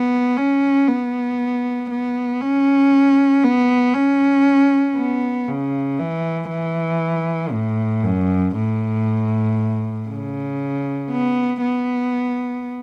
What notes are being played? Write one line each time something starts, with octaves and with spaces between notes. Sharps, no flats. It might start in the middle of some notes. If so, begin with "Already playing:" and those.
Already playing: B3
C#4
B3
B3
C#4
B3
C#4
B3
C#3
E3
E3
A2
F#2
A2
C#3
B3
B3